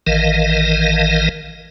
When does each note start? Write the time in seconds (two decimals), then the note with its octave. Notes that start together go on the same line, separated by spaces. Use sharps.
0.07 A1 D#3 E3 A#4 D#5 F5